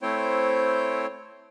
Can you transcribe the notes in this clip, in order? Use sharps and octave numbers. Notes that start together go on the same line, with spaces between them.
A3 C4 E4 C5 C#5 G5